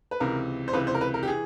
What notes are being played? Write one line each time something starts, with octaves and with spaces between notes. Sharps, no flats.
B4
C#2 C3 E3 A#4
C5
C#2 C3 E3 B4
C5
A#4
B4
A#4
G4
E3 G#4